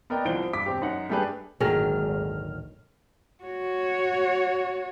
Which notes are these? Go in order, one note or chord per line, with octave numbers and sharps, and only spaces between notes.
B3 A#4 D5 D#5 G5
C2 E3 F3 C5 D7 G7
G2 D6 B6
E1 C4 G4
F#2 D#4 F#5
G3 A3 D4 G4 G#4 B4
G#1 D2 A#2 D3 D#3 F#3 G#4 F6
F#4 C#5